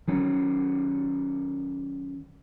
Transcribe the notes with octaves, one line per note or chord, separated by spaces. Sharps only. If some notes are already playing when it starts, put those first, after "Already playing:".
D#3 F#3 C#4